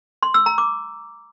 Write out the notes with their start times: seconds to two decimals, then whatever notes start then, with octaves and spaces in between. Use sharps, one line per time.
0.23 C6
0.34 E6
0.46 A#5
0.58 D6